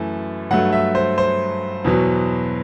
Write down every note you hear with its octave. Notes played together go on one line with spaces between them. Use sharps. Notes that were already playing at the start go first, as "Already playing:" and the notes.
Already playing: F#2 E3 A3
G2 F#3 A3 F#5
E5
C5
C5
E2 B2 F#3